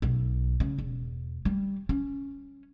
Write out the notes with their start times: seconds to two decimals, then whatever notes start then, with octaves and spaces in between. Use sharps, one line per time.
0.02 B1
0.60 C#3
0.78 E1
1.45 G3
1.89 C#4